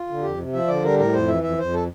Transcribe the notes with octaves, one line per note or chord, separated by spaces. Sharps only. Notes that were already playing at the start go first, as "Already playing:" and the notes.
Already playing: F4
D3
F2 G4
C3
F3 E5
D3 D5
G3 A#4
A2 A#4
F2 C5
E3 E5
F2 E5
F2 C5
A4